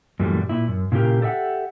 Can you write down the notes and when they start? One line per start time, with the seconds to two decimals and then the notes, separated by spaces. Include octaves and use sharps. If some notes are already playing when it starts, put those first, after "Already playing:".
0.20 F#2 A#2 E3 G3 A3
0.49 A#2 E4
0.68 F#2
0.92 A#2 C#3 E4 G4 A#4
1.21 G4 A4 D5 E5 F#5